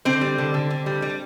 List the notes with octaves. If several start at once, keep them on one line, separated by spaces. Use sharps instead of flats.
D3 C4 C5
G3
D3
D3
D3
G3
G3